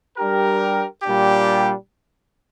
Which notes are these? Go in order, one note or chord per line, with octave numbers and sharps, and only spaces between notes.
G3 D4 G4 A#4
A#2 G3 D4 G4